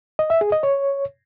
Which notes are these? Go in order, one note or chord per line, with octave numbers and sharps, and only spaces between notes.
D#5
E5
G#4
D#5
C#5